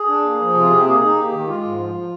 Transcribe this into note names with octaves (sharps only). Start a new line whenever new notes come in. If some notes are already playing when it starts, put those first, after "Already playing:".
Already playing: G#4
D4
A#3
F3
C3 F4
C3 G4
A#3 G#4
D#4
A#3 G4
D#3
G#3 F4
G#2
F3
F3